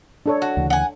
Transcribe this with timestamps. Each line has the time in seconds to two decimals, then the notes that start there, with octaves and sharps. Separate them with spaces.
0.26 D4 A4 C#5
0.42 F#4
0.57 D2 C#3 E3
0.70 F#5 G#5